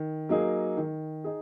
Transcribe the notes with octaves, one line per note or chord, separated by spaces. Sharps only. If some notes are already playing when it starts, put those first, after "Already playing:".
Already playing: D#3
F#3 A#3 D#4 G#4
D#3
D#4 G#4